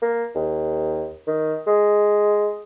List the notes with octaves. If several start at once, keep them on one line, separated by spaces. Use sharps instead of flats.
A#3
D#2
D#3
G#3